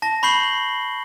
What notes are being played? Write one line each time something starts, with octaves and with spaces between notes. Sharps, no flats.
A5 A#6
B5 C#6 G6 C7 F#7 G7